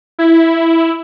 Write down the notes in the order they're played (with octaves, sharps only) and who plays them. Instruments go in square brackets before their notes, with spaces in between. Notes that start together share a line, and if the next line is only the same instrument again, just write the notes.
[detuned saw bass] E4